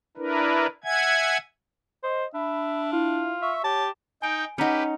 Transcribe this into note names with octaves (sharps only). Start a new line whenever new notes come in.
D4 E4 A#4 B4
E5 F#5 G#5 G#6
C5 D#5
D4 E5 B5
E4 F4
E5 C#6
G4 C#5 A5
D#4 G5 G#5 D7
C#4 D#4 G4 B4 F#5 A#5 C#7